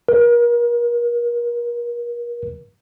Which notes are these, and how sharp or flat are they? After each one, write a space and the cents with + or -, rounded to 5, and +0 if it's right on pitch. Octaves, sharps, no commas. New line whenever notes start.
A#4 +40